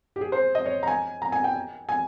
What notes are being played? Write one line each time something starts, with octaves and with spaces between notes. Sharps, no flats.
G4
G#4
C5
D#5
C#5
A#5
G#5
A#5
G#5
G5
G#5